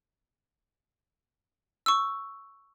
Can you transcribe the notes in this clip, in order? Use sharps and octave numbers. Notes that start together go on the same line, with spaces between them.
C#6 E6